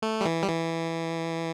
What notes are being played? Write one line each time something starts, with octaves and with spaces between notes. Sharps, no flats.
A3
G3
E3
G3
E3